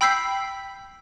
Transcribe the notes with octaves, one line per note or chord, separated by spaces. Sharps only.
G5 B5 E6 G6 B6 C7